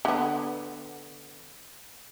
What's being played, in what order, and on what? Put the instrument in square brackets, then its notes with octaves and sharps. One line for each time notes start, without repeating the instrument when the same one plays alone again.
[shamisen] D3 B3